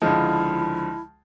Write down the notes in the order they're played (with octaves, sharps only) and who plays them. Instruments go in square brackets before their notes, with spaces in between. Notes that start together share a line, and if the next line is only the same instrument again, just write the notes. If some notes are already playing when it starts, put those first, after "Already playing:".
[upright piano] C#2 D3 F3 [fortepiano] G#3 [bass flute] E4 [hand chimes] A5 F6 G6